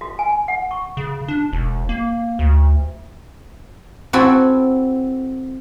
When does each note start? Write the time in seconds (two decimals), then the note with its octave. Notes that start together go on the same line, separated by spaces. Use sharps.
0.01 F#4
0.19 G#5
0.48 F#5
0.71 C#6
0.97 C#3
1.28 D4
1.53 E1
1.89 A#3
2.39 D2
4.13 C4 E4 F#4 A4 G#5